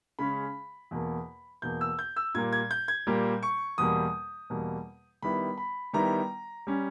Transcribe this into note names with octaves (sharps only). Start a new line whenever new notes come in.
C#3 G#3 C#4 B5
E2 B2 A#3
E2 B2 A#3 G6
E6
G6
E6
A#2 G3 A#3 G#6
G#6
G6
G#6
A#2 G3 A#3
C#6
E2 B2 G3 A#3 D#6
E2 B2 G3 A#3
D#3 G3 B3 E4 B5
B5
D#3 G3 B3 E4 A#5
G3 C#4